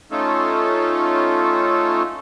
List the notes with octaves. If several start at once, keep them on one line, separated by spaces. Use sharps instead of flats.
A3 C#4 D#4 F4 A4